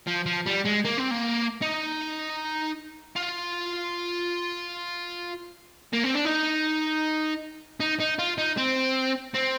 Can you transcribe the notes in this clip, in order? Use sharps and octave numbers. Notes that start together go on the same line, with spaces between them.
F3
F3
G3
G#3
A#3
C4
A#3
D#4
F4
A#3
C4
D4
D#4
D#4
D#4
F4
D#4
C4
C4